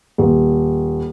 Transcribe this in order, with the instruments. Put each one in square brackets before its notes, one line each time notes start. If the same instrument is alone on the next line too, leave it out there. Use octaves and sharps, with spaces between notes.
[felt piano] D#1